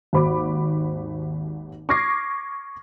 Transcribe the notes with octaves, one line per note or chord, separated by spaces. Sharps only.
G#1 D#2 F#4 C5 B5 D6
C#6 D6 F6 G#6 A#6 C7